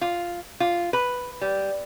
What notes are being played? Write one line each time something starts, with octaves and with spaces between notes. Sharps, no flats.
F4
F4
B4
G3